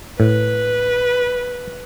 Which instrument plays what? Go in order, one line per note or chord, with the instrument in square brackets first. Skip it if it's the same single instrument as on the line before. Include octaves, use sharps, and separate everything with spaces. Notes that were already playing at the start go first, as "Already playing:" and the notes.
[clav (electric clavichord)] A2 [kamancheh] B4